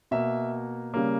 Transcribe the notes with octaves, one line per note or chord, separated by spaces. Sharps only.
B2 A#3 E5
C#3 G3 A#3